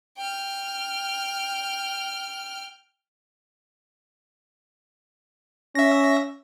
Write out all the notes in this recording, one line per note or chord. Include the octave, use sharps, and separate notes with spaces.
G5 F6
C#4 E5 A#6